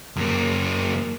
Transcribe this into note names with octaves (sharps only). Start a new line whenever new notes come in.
F#2 A#3